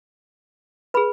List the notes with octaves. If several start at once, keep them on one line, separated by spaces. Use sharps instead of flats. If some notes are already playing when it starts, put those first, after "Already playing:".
G#4 B4 B5